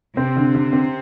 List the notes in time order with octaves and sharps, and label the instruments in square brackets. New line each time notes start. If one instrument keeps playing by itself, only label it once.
[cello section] C3 [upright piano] C4
[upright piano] D3
D3
C4